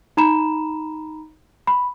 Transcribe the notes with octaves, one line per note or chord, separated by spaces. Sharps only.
D#4 A#5 B5 E7
B5